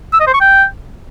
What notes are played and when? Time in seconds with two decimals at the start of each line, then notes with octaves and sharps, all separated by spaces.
0.13 E6
0.20 D#5
0.27 C5
0.34 C#6
0.41 G5